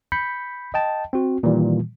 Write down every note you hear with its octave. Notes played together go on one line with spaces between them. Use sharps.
B5 G6 B6 C#7
D#5 G5 A5
C4 F#4
A#2 D#3 E3 G3